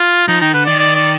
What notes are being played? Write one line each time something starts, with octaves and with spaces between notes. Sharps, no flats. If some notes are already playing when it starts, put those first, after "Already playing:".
Already playing: F4
F3 D#4
D#3 D#4
D3 B4
D#3 D5
D5
D5